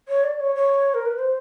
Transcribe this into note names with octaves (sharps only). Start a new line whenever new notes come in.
C#5
D5
C#5
C#5
A#4
B4
C5